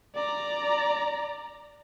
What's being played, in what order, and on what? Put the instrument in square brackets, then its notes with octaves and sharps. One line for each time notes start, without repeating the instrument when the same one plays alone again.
[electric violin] D5 A#5